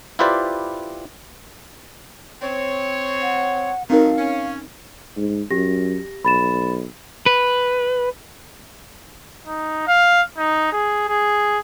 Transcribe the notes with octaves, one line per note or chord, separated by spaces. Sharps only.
E4 F4 G4 B4 C5 D5
C4 C#5
F#5
D#3 F#3 C4 D#4 A4 A#4 F5
C#4
G#2
F#2 G4 A#6
B1 B5 A6 E7
B4
D#4
F5
D#4
G#4
G#4